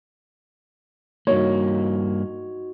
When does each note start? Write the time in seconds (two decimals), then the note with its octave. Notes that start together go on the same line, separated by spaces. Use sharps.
1.27 G2 A#3 D#4 F#4 C#5 D#5